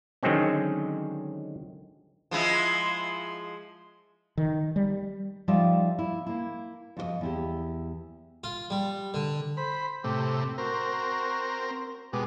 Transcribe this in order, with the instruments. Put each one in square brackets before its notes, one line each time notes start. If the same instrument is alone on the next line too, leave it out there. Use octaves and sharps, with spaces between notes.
[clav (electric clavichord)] D3 D#3 F#3 G#3 C4 C#4
[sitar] F3 G#3 E4
[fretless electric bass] D#3
G3
[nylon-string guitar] F3 G3 D#4 F4 D5 E5
E4
A#3 E4
F2 F#4 D#5
E2 E4 G4
[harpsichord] F4
G3
D3
[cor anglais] C5 [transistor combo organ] B5
[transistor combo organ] A2 C3 [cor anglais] G4
[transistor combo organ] C4 A#4 [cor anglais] F#4
[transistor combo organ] B2 G#3 [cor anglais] G4